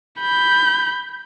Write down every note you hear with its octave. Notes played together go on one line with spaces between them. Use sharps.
B5 G6